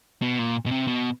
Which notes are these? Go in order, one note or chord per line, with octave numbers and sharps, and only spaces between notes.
B2
A#2
B2
C3
B2